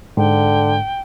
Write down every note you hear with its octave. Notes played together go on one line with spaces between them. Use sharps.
G#2 D3 G5